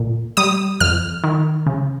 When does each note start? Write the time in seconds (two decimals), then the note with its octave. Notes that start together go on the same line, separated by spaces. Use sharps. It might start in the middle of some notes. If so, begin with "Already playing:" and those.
Already playing: A#2
0.37 G3 D#6
0.80 F2 F6
1.24 D#3
1.66 C#3